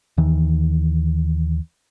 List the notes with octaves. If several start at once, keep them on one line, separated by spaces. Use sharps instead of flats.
D#2 D#3 E3